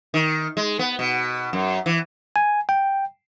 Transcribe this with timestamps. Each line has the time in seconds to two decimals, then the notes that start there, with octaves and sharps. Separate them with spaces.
0.14 D#3
0.57 G#3
0.79 B3
0.99 B2
1.53 F#2
1.86 E3
2.36 G#5
2.69 G5